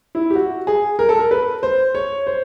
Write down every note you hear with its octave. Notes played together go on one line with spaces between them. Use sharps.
E4
G4
F#4
G#4
A#4
A4
A#4
B4
C5
C#5
C5